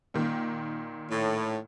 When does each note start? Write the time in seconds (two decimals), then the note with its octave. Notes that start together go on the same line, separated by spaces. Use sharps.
0.14 A#2 D#3
1.10 A2